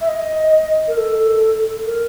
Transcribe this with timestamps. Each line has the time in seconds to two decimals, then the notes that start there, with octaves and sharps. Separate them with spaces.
0.01 E5
0.08 D#5
0.87 A#4
0.97 A4
1.86 A#4